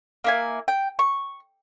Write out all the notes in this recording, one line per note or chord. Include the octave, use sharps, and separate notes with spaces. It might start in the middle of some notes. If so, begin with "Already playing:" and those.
A#3 E4 G#5
G5
C#6